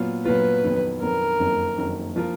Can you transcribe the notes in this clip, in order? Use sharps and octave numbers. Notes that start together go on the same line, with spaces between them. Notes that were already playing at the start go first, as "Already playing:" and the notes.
Already playing: A#2 F#3 B3 F4
A#2 F#3 B3 F4 B4
F2 D#3 F#3 B3
F2 D#3 F#3 B3 A#4
F#1 F2 D#3 F#3 A#3
F#1 F2 D#3 F#3 A#3
F3 A#3 F4 A#4